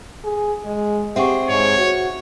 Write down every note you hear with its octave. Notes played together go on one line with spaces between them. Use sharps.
G#4
G#3
C4 G4 G#4 E5 F#5 C#6
G#2 C#5
F#4